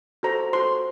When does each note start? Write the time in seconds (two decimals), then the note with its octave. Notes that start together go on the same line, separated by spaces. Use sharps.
0.23 F#4 A4 C5 A#5
0.53 F#4 A4 C5 C6